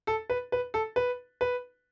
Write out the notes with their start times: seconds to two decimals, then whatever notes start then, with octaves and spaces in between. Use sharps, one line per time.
0.07 A4
0.30 B4
0.52 B4
0.74 A4
0.96 B4
1.41 B4